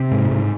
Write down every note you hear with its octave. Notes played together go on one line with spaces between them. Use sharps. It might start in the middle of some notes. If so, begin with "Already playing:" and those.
Already playing: C3 C4
G#2
G#2